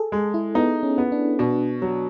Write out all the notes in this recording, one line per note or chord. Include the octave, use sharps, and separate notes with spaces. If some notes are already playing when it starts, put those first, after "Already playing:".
Already playing: G#4 A4
G#3 G#4
E4
B3 D#4
C#4
B3
D4
B2 D4
F#3